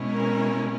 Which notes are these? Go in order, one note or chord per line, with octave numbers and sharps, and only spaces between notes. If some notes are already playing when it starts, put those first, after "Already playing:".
Already playing: B2 G#3 C#4 E4
A#4